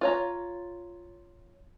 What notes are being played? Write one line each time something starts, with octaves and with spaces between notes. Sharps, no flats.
F4 C#5 A#5